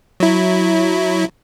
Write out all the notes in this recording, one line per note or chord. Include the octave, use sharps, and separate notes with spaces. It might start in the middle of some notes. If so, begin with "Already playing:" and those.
F#3 E4